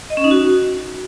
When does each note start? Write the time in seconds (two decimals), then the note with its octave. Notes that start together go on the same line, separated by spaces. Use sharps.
0.10 D#5
0.17 C#4
0.24 D#4
0.31 F#4